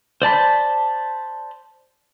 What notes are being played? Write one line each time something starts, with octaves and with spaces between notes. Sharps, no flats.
C5 D5 A5 B5